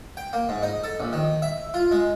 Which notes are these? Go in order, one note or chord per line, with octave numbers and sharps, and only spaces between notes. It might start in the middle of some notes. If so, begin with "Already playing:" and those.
G5
A#3
G#2
D#4
A4
A#1
D#3
E5
F4
G#3